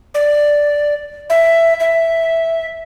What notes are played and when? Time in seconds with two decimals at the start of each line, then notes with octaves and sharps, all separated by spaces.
0.14 D5
1.30 E5
1.80 E5